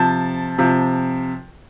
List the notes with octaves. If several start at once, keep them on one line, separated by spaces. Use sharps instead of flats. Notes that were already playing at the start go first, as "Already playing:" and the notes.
Already playing: C3 F3 A5
C3 F3